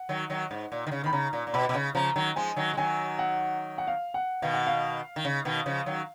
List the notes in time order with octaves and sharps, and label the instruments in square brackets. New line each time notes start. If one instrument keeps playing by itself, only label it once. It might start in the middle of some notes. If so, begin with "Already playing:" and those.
Already playing: [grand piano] F#5
[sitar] D#3 F#3
D#3 F#3
G#2
A#2
D#3
C#3
[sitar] D#3 [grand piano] B5
[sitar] C#3 [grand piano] A#5
[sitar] A#2
A#2
[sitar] B2 [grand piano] B5
[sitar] B2
C#3
[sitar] C#3 F3 [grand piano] A#5
[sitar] D#3 F#3
[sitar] F3 G#3 [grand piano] G#5
[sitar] D#3 F#3
G#3
[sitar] D#3 F#3 [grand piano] G#5
[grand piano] F#5
F#5
F5
F#5
[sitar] B2 D#3 [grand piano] F5
[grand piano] F#5
F5
[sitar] D#3
C#3
B2 D#3
C#3 F3
D#3 F#3